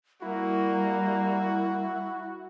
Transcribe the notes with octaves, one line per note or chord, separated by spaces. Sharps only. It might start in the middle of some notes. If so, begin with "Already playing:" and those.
G3 A#3 E4 F#4